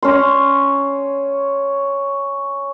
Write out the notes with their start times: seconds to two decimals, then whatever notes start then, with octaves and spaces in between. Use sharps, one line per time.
0.03 C#4 C6